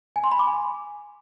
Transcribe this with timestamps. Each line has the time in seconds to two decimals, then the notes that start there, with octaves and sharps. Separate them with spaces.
0.16 G#5
0.24 C6
0.31 B5
0.39 D6
0.47 G#5